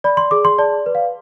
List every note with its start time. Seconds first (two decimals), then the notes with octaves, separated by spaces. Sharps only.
0.04 D5 B5
0.17 C6
0.31 G#4 D6
0.45 C6
0.59 D5 A5
0.86 B4
0.95 F5